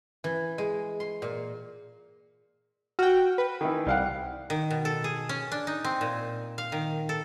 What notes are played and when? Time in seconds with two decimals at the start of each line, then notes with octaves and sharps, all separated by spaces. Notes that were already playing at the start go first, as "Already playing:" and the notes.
0.24 E3
0.58 G#3
1.00 C6
1.22 A#2
2.99 F#4 G5 F6
3.38 B4
3.61 D#3 E3
3.87 C2 G3 F5 F#5
4.50 D#3
4.70 B2
4.85 A4
5.04 G#4
5.29 C#4
5.52 D4
5.67 D#4
5.84 C4
6.01 A#2
6.58 F5
6.72 D#3
7.09 A4